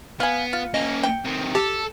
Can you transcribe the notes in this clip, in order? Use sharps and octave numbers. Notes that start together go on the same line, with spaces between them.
B3 F5 G#5
F4
A#3 C#4 D#5
G5
C3 D#3
G4 A4 A5